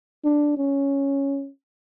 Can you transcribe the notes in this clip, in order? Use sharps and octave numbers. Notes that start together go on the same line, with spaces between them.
D4
C#4